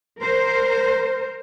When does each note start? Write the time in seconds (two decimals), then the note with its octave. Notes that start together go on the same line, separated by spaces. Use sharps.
0.19 A#4 C5